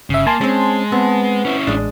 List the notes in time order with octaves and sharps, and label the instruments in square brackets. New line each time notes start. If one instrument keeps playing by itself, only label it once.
[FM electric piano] G1 E5 [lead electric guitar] C#3
[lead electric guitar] A#3 [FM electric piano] G#5 A5 C6
[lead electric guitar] G#3 [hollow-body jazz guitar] C4 C#4
[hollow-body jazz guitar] B3 C4
[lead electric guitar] C#4 E4
[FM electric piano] A1 [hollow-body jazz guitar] G#3 D4